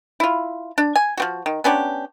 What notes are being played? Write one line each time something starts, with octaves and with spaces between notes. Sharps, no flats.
E4 F4
D4
G#5
F3 C4 F#4
D#3
B3 C#4 D4 G4